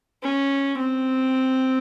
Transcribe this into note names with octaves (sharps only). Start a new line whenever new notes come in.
C#4
C4